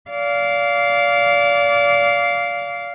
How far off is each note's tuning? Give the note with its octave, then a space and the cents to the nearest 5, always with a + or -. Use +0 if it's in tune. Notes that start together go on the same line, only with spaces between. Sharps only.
D5 -30 F5 +0